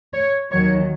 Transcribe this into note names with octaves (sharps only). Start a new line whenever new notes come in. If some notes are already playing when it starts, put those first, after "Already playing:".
C#5
D#2 D#3 F#3 C#5